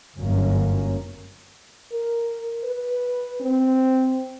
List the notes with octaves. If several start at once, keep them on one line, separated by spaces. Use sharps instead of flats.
G1 F#2 A#3 C#4
A#4
B4
C4